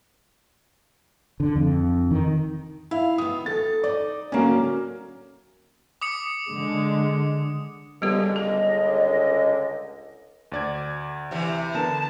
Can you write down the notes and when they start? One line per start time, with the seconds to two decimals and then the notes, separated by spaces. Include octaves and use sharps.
1.40 D3
1.56 F2
2.11 D#3
2.91 E4 F5
3.18 D#3 B3 D#6
3.46 A4 A6
3.84 D#4 D5
4.32 A2 D3 F#3 A#3 C#4
6.02 D6 D#6 C#7
6.49 D3 G#3
8.02 C#2 D3 G3 B3 G4
8.36 G#4 D#5
10.52 D2 D5 G#6
11.31 C3 E3
11.75 D3 B3 A#4 A5